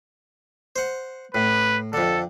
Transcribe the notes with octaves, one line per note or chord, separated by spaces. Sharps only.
C5 F#5
A2 B4
F2 D3 A4